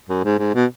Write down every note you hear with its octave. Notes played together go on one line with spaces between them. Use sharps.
F#2
G#2
G#2
B2